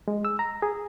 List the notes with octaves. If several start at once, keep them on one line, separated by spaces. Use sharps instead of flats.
G#3
E6
A#5
G#4